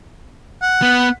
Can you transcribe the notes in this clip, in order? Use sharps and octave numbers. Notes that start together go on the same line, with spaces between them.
F#5
B3